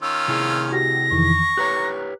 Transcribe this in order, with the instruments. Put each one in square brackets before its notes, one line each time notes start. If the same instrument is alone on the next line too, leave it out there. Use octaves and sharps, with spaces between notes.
[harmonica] D#3 C#4 F4 [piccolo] E6
[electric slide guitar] C3 E4 G#4
[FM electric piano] F#4 G4 [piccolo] A#6
[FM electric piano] F2 D#3 E3 [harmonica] C#6
[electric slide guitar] G4 B4 C#5 [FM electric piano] A#5 F#6